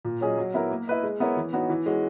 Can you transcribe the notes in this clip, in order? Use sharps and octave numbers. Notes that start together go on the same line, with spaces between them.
A#2
F#3 C#4 G#4 D#5
F#3
B3 E4 A#4
A#3
E4 B4 D#5
G#3
B3 E4 A#4 C#5
E3
B3 D#4 F#4 C#5
E3
G#3 C#4 F#4